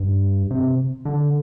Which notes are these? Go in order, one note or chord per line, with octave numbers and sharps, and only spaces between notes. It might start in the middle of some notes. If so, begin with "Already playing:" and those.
Already playing: G2
C3
D3